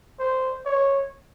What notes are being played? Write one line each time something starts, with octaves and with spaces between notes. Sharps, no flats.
C5
C#5